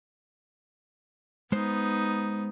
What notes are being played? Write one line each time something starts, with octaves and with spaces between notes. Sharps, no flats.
G#3 B3 D#4 C5